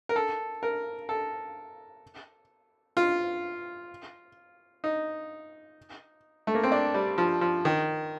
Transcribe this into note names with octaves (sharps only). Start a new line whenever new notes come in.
A#4
A4
A#4
A4
F4
D#4
A3
A#3
C4
D4
G3
F3
F3
D#3